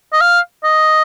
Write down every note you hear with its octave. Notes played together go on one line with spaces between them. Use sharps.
D#5
F5
D#5